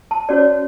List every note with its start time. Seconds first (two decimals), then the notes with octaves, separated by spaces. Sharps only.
0.11 A5
0.29 C#4 F#4 C#5 D5